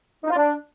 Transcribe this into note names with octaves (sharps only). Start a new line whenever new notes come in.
D#4
F4
D4